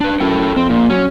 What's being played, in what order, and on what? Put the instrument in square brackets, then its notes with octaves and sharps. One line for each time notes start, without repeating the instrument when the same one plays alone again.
[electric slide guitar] D4 B4
[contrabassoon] F#2 [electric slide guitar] E4 A4 G5
[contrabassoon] F2 [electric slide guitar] C4
[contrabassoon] A#1 [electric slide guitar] A#2
[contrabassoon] F#3 [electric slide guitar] C#4